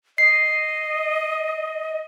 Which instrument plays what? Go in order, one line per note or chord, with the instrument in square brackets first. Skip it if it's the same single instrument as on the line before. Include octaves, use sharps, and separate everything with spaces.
[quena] D#5 [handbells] C7